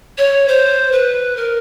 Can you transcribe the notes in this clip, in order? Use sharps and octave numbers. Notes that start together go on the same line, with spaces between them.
C#5
C5
B4
A#4